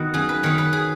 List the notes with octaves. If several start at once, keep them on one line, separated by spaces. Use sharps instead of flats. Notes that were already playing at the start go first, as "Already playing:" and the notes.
Already playing: D#3 B3 D#4 F#4
F#2 G#4
B4
D#3 B3 C#5
B4
G#4